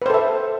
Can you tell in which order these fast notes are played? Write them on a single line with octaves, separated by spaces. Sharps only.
B4 C5 A4 E5